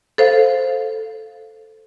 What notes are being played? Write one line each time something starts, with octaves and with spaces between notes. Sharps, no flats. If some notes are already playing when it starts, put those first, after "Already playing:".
A4 C5 F5